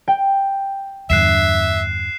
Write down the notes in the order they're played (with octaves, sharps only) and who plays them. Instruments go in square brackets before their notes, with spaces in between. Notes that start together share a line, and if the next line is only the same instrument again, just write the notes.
[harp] G5
[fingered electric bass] E2 G2 D3 [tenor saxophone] E5 [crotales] F#6 C7 E7